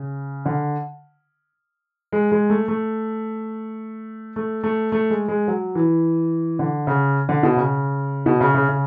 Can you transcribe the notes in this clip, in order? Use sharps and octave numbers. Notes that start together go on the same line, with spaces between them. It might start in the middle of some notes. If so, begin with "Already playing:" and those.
Already playing: C#3
D3
G#3
G#3
A3
A3
A3
A3
A3
G#3
G#3
F#3
E3
D3
C#3
D3
B2
C#3
B2
C#3
C#3
C#3